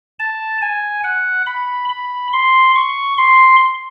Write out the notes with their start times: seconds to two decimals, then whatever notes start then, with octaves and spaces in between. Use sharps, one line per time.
0.19 A5
0.61 G#5
1.04 F#5
1.46 B5
1.89 B5
2.33 C6
2.76 C#6
3.18 C6